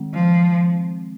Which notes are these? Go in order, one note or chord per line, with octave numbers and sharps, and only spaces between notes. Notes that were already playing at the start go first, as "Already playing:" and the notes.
Already playing: D#3 G#3 C4
F3